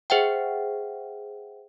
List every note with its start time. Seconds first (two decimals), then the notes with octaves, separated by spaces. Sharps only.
0.10 G#4 C5 E5 F#5 G5